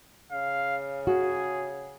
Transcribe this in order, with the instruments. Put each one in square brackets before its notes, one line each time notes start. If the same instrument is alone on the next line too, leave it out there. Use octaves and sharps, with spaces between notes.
[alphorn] C#3 [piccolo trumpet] F5
[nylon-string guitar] F#4 [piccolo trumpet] G#4